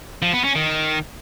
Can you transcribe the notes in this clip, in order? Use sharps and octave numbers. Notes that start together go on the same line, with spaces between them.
F3
B3
C#4
D#3